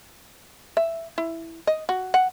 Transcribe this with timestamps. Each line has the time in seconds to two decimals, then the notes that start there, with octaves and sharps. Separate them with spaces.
0.77 E5
1.18 E4
1.67 D#5
1.89 F#4
2.14 F#5